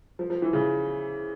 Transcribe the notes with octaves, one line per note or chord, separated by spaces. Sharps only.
F3
F3
E3
C#3